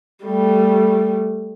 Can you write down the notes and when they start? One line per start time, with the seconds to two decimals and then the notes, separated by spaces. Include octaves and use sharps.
0.25 G3 A3